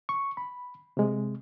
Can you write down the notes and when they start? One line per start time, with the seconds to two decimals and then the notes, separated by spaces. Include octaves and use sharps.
0.09 C#6
0.37 B5
0.97 C3 G#3